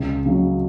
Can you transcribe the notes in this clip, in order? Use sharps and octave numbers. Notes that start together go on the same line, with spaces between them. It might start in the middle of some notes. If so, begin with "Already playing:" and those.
Already playing: C#2
C#3 F#3